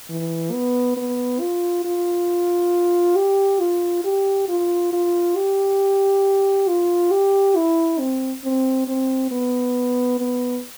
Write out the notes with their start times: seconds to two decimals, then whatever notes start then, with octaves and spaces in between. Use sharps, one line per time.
0.09 E3
0.52 B3
0.97 B3
1.40 F4
1.84 F4
3.17 G4
3.60 F4
4.04 G4
4.49 F4
4.93 F4
5.36 G4
6.68 F4
7.11 G4
7.56 E4
7.99 C4
8.44 C4
8.87 C4
9.31 B3
10.19 B3